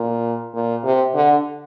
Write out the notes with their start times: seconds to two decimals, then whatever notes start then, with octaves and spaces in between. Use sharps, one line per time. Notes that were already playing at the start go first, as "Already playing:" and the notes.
Already playing: A#2
0.54 A#2
0.84 C3
1.15 D3